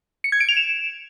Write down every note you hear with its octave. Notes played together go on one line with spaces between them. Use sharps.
C#7
G#6
D7
F7
E7